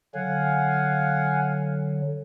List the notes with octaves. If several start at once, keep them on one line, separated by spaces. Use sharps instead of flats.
D3 F#3 F5 F#5 G#5